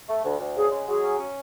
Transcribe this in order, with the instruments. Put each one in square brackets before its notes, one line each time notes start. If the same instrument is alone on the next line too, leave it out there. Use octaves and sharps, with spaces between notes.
[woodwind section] A3
D2
D2
[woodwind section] C#3 [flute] G#4
[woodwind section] G#3
[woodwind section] F#3 [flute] G#4
[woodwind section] C#4
C#4